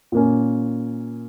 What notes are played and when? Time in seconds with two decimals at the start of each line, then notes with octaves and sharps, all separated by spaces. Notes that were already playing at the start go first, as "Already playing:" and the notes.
0.12 A#2 A#3 C#4